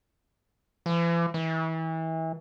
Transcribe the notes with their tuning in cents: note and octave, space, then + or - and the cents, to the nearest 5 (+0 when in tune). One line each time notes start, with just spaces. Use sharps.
E3 +45
E3 -30